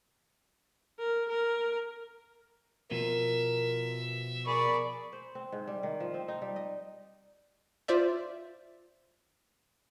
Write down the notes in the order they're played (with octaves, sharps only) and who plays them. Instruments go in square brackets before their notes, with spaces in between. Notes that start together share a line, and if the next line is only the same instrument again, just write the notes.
[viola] A#4
A#4
[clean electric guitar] B2 F3 [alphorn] A#4 [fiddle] E5
[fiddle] G#4 D5 [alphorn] A#4 [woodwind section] B5 C#6
[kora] C5
C4
G#2
G3
D#3
F3
C4
D#4
G3
D#5
[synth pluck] F4 C5 D5 E5